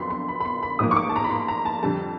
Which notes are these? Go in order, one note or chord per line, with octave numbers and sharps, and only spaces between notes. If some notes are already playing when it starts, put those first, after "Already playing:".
Already playing: F2 D3 F#3 B3 B5 C6
C6
B5
B5
C6
B5
A1 G#2 F3 A#3 D#6
C#6
D6
A5
A#5
B5
C6
A#5
A5
F2 D3 G3 A5